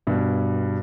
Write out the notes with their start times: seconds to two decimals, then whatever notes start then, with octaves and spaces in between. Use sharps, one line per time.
0.07 G2 B2